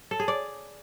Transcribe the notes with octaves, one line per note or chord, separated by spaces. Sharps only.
A4
G#4
D5